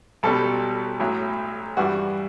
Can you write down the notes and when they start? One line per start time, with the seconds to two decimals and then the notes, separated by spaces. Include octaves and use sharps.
0.23 B1 B2 G3 A4
1.00 B1 A2 F#3
1.77 G2 E3 G3 F#4